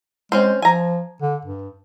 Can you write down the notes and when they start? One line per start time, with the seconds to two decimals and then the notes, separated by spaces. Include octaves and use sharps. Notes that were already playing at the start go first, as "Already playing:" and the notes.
0.32 G#3 C4 C#4 C5
0.62 F3 G#5 A#5
1.22 D3
1.45 G2